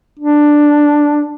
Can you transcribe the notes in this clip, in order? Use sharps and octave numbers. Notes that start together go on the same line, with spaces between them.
D4